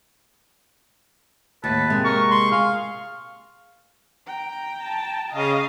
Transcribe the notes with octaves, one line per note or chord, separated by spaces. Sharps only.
D#2 A2 B4 A5
C3 G#3 A#3
A#4 C#6
C6
G#4 F5
G5 A#5
A5
C#3 D#5 F5